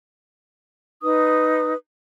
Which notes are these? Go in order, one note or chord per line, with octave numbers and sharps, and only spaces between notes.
D#4 B4 D#6